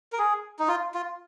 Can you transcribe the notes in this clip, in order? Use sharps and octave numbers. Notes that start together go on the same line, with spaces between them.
A#4
G#4
D#4
F4
F4